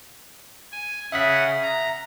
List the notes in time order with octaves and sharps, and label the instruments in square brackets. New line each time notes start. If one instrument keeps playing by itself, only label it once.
[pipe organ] G#5
[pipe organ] C#3 G#4 F#5 [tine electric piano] E5 B6
[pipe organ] A#5